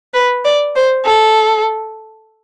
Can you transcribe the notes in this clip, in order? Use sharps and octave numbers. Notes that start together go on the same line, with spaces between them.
B4
D5
C5
A4